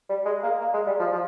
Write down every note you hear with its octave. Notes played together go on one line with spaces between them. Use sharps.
G3
G#3
A#3
A#3
G#3
G3
F3
F3